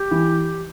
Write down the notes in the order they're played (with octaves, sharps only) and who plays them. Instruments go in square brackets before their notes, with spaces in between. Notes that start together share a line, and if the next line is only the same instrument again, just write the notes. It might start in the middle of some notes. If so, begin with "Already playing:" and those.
Already playing: [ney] G4
[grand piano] E3